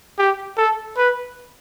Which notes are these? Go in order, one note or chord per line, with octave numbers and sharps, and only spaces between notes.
G4
A4
B4